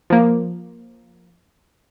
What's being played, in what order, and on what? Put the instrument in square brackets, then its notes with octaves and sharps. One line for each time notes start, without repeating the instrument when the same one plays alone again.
[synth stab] F3 A#3